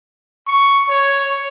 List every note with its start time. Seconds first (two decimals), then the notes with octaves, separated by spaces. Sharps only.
0.47 C#6
0.88 C#5